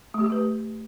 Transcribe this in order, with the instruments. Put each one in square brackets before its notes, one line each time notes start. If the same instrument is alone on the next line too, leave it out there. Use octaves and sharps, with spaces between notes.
[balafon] A3
G4
A3
B4